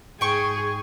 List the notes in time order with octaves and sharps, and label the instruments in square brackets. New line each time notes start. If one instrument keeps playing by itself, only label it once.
[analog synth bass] G#2 [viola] G#4 [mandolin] G5 C#6